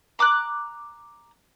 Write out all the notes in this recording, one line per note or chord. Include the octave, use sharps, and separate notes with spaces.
A#5 D6 E6 F#6